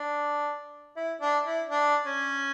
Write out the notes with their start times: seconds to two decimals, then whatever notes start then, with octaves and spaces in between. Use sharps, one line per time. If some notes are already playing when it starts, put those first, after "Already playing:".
Already playing: D4
0.97 E4
1.21 D4
1.45 E4
1.69 D4
2.05 C#4